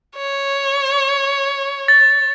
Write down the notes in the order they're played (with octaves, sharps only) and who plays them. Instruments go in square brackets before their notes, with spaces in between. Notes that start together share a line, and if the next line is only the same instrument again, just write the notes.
[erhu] C#5
[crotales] A6